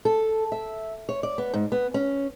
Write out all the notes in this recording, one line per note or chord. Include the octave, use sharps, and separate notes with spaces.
A4
E5
C#5
D5
B3
G#2
B3
C#4